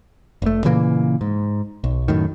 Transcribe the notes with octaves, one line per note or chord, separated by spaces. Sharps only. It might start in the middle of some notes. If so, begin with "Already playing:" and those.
F1 A3
A#2 C#3 E3 A#3
G#2
B1
F#2 A2 D#3